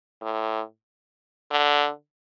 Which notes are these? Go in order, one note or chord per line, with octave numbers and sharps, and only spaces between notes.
A2
D3